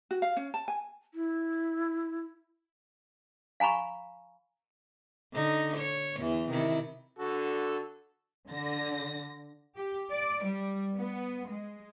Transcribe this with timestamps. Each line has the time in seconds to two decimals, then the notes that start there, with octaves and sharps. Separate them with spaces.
0.11 F#4
0.22 F5
0.37 C#4
0.54 A5
0.68 G#5
1.14 E4
3.60 F5 G#5 A#5 B5 C#6
5.34 D3 D#4
5.78 C#5
6.19 E2 E3
6.51 C3 D#3 E4
7.19 D3 F#4 A4
8.50 D3 A#6
9.76 G4
10.11 D5
10.45 G3
10.95 B3
11.47 G#3